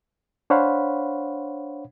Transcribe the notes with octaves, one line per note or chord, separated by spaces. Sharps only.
D4 C5 C#5 F5 F#5 B5